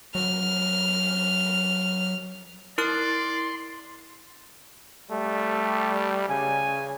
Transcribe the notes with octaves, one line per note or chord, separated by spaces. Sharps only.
F#3 F6
E4 A#4 D5 C6 F6
G3 A3
C#3 G#5